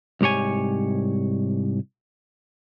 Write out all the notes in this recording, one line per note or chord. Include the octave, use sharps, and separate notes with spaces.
C2 G#2 G4 C#5 G#5